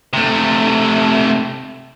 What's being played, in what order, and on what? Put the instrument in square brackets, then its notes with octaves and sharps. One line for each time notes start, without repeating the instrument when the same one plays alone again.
[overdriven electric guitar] C3 A3